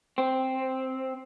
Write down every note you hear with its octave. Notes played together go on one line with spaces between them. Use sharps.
C4